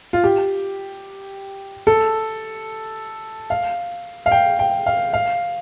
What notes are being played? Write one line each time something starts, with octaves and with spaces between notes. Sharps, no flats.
F4
G4
A4
F5
F5
G5
G5
F5
F5